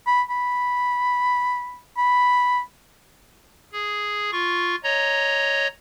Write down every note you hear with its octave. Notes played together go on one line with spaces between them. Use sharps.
B5
B5
B5
G#4
F4 C#6
C#5 D#5 A#5